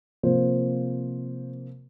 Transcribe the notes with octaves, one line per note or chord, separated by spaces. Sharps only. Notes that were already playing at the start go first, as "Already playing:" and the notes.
C3 F3 A#3 C5